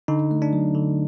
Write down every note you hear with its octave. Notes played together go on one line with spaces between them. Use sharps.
D3 D#4
A3
D4
F#3
D3